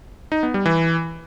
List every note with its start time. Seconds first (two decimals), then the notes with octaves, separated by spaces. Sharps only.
0.32 D#4
0.43 B3
0.54 G3
0.66 E3